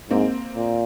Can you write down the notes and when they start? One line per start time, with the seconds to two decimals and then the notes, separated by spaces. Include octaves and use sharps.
0.10 G#2 A#3 C4
0.55 A#2